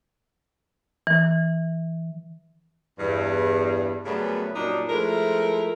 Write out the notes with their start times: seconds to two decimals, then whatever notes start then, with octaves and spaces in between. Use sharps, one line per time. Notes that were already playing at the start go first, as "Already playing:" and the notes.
1.07 E3
2.99 E2 G2
4.05 F#2 C#3 G3 A3 B3 C#4
4.55 F#2 A#2 F#3 G3 D4 D#4
4.90 F3 G#3 A3 E4 A#4